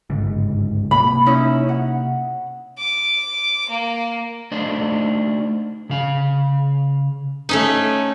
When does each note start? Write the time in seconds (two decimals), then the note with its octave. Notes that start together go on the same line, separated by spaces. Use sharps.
0.10 G1 C#2 G#2
0.91 C3 A#3 B5
1.26 C#4 D#4 E4
1.69 F#5
2.79 D6
3.70 A#3
4.52 A3 D4 D#4 C5 D#5 F5
5.90 C#3 F5
7.49 A3 C#4 D#4